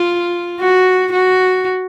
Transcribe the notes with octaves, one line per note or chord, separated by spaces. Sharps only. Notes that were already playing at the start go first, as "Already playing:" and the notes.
Already playing: F4
F#4
F#4